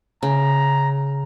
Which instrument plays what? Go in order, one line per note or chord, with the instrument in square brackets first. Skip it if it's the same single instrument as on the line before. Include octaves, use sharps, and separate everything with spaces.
[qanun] C#3 [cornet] A#5